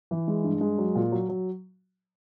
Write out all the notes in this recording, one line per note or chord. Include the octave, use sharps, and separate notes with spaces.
E3
G#3
G2
G#3
F#3
A#2
F#3
F#3